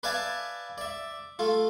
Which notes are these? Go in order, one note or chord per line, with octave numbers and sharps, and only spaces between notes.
B4 D5 E5 F5 G#5 A5
D5 E5
A3 F4